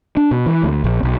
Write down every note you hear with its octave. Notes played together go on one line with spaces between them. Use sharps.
D4
B2
E3
D2
A#1
B1